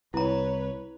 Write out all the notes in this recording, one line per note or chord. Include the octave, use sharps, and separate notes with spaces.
C2 E4 B4 C#5 A#5